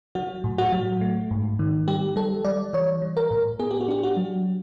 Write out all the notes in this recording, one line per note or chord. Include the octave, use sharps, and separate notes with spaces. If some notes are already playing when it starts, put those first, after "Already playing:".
F#3 F#4
A2
F#4
F#3
A3
G#2
D#3
G3 G4
G3 A4
G3 D5
E3 C#5
G3
A#4
A2
B3 G#4
G4
F#4
D4 G4
F#4
F#3